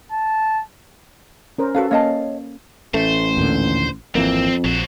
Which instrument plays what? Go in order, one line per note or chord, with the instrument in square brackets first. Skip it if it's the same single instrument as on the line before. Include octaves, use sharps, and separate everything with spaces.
[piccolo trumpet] A5
[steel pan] C#4 A#4 C5
[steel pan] C#4 A4 [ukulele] F#4 B4 F5
[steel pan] A#3 C#4 F5 [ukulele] C#5 D#5 A5
[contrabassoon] A1 [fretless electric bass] A3 [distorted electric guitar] C5
[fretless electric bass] D#2 A#2 D3
[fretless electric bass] G#1 E3 A#3 [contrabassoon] F2 [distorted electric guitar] C4
[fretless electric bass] A#1 [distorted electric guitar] F#3 C5